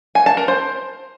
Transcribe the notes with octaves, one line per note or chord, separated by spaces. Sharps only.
G#5
A5
A#4
C5